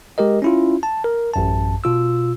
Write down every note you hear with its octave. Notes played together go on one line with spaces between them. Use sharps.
G#3 G4 A#4 D#5
C#4 E4 F4
A5
A#4
A1 F#2 A5
B2 F4 E6